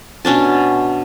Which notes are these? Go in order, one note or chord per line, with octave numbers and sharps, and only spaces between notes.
B2 C#4 D4 A5